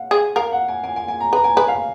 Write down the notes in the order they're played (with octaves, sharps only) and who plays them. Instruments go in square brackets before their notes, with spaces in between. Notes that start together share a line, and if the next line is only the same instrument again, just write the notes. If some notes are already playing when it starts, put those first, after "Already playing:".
Already playing: [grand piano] F5 F#5
[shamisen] G#4
[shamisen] A#4 [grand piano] F5
[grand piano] F#5
G#5
G#5
G#5
G#5
A#5
[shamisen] B4 [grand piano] A#5
[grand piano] G#5
[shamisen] B4 [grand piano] G#5
[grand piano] F5